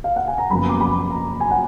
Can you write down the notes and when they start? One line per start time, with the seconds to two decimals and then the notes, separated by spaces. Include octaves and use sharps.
0.04 F5
0.16 F#5
0.28 G#5
0.38 A#5
0.50 F#1 F#2 F3 B3 B5
0.69 D6
0.81 B5
1.10 A#5
1.40 G#5
1.51 F#5